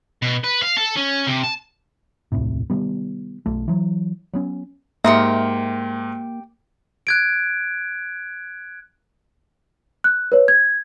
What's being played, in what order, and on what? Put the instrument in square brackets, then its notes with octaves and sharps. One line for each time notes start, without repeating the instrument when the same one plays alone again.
[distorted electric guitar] B2
B4
F5
A4
C#4
C3
A5
[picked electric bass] D#1 C2 A2 C3
C3 D#3 G3 B3
B1 A3
E3 F#3
F#3 B3 C#4
[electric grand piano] G#2 A#4 C#7 [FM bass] A#3 [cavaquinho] G4 C6 D#6 [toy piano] E5
[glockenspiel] F#6 G#6 D7
[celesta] F#6
B4 C#5
G#6